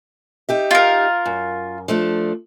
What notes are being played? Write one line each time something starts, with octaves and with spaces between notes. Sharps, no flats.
D#4 G4 E5
F4 A#4
F#2
F3 A3 D4